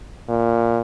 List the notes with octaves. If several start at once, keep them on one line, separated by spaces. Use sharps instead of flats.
A#2